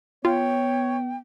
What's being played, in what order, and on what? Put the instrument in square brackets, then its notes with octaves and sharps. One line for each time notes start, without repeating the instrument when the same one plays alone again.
[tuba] B3 [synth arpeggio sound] F4 [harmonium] C#5 [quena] G5